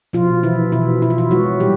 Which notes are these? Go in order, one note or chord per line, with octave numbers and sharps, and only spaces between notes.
B2 F3 F4
B2 E3 E4
B2 E3 E4
B2 E4
F4
E3 E4
F#3 G#3 F#4
A#2 G3 G4